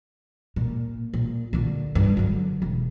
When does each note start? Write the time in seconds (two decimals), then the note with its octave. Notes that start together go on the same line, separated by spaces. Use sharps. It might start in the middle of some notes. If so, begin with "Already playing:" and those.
0.56 A#2
1.14 A#2
1.53 A#2 D3
1.95 G2
2.17 D3 F#3
2.62 E1